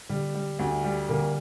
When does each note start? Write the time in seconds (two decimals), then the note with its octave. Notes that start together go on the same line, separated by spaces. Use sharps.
0.09 A#2 D3 G3
0.34 G3
0.59 D2
0.84 G3
1.09 A#2 D3 A#3